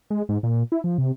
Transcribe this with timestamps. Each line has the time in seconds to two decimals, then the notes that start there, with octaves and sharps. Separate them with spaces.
0.10 G#3
0.29 G#2
0.43 A#2
0.72 E4
0.84 F3
0.98 C3